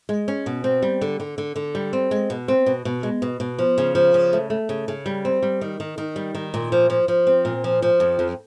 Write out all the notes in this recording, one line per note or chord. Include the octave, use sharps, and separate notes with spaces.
G#3
C#4
B2
C4
G3
D3
D3
D3
D3
G3
C4
G#3
B2
C4
B2
B2
G#3
B2
B2
F3
C#3
F3
C#3
A3
A3
C#3
C#3
G3
C4
G3
D#3
D#3
D#3
G3
D#3
A#2
F3
F3
F3
C4
A#2
F3
F3
F2
F2